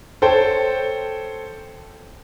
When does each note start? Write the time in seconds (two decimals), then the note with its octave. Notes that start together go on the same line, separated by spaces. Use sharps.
0.22 A4 C5 C#5 G5